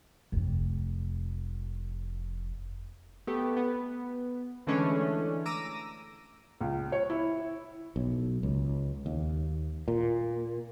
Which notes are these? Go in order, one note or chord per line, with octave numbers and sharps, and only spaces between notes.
F1 F2
A3 B3 G4
B3
D3 E3 G#3 A3 C#4 D4
A#5 D6 E6 A#6 D#7
C#2
C#5
E4
B1
C#2
D#2
A#2